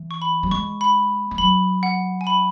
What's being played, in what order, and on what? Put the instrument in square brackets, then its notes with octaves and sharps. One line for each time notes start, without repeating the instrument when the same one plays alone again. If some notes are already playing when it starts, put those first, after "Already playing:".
Already playing: [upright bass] E3
[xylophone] C#6
B5
[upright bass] F#3
[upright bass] G#3 [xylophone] C#6
[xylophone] B5
[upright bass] G#3
[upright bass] F#3 [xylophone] B5
[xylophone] F#5
G#5
B5